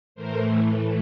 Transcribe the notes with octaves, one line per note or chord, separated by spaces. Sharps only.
A2 E3 A3 A#4 C5